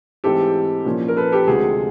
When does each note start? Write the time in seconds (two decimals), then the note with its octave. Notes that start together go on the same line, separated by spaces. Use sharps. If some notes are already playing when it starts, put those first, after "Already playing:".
0.24 G#2 E3 A3 C4 G4 A4
0.85 A#2 F3 A#3 C#4
1.08 A#4
1.17 A4 B4
1.32 G4 A4
1.47 D2 C3 F3 G#3 F#4 G#4